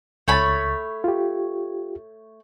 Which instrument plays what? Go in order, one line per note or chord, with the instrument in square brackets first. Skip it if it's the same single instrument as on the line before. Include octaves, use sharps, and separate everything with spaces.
[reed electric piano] C#2 A6 [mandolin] A3 C#5 B5
[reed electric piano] F4 G4